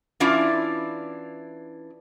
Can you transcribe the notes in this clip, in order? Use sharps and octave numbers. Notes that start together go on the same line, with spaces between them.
E3 C#4 D4 E4 F4 D5